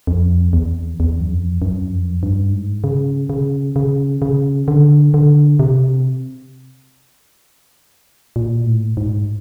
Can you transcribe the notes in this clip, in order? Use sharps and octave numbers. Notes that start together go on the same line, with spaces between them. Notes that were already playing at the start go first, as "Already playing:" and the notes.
F2
E2
E2
F#2
F2
F#2
F2
G2
G#2
C#3
C#3
C#3
C#3
D3
D3
C3
A#2
A2
G#2